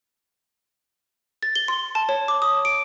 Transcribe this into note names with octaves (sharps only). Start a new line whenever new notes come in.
A6
G7
C6
A5
C#5
D6
D#6
D7